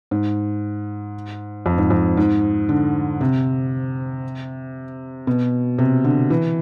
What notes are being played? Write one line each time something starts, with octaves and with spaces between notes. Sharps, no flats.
G#2
F2
G#2
F2
G#2
D3
C3
B2
C3
D3
E3